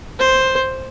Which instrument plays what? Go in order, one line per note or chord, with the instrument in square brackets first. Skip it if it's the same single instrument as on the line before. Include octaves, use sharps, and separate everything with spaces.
[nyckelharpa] C5